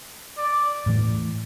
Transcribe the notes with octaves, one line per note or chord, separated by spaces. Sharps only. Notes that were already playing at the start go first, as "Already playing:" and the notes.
D5
A2 E3 A3